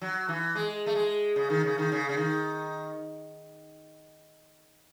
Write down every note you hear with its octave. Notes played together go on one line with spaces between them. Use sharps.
F#3
E3
G#3
A3
G#3
C#3
D#3
C#3
D#3
C#3
C#3
D#3